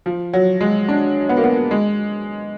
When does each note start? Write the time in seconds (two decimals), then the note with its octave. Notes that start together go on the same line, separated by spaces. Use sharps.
0.06 F3
0.33 F#3
0.61 G#3
0.89 D4
1.29 B3
1.37 A#3
1.44 B3
1.71 G#3